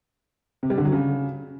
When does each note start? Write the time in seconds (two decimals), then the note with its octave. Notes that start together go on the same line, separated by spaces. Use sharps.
0.63 C3
0.70 G3
0.78 D3
0.85 F#3
0.92 C#3